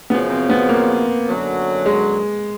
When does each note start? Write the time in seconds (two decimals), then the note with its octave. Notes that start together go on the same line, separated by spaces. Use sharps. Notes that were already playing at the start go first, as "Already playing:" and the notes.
0.10 F#2 C#3 F3 B3
0.30 C4
0.50 B3
0.69 A#3
1.27 F#2 D3 F#3
1.86 G#3